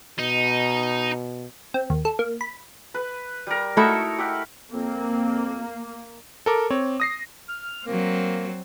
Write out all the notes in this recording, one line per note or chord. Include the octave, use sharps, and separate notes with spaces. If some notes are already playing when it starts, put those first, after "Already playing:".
B2 D#4
C4
D#2
A4
A#3
B5
B4
G3 A#4
A3 D#4 E4 F#4 A4 C#6
G4 E5 F#5
F2 A#3 C4
A4 A#4 D6
C4 C#5
D#6 A#6 C7
F6
F#3 A#3 C4 A#4